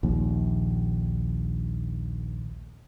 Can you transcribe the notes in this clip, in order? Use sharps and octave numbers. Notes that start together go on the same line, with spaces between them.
A#1 D#2